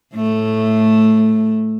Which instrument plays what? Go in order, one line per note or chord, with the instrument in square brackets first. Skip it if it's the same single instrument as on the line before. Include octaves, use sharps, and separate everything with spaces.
[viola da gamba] A2 A3